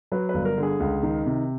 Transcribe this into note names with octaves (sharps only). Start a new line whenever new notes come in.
F#3 B4
B4
G1
A#4
D3
G#4
C#2
D#3
C3